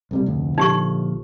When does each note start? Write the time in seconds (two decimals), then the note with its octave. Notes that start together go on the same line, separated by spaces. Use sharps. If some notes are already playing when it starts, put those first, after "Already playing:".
0.11 B1 C3 G3
0.26 F1 D2
0.58 A#1 D3 F3 D#4 G4 C#6